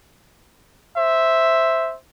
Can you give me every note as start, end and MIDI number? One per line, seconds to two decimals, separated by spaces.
0.96 1.97 72
0.96 1.97 76